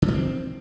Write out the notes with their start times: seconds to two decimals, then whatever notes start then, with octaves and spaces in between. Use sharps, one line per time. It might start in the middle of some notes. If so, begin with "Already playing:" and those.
0.02 C#3
0.08 D3
0.14 C4